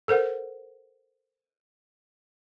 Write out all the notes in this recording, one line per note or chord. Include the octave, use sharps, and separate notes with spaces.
A4 A#4 C5 F#5